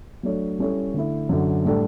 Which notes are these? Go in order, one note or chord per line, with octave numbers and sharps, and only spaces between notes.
F#3 A3 D4 A4 C#5
G3 C#4 E4 A4 C#5
D3 A3 E4
F#2 D3 F#3
A2 G3 D4 A4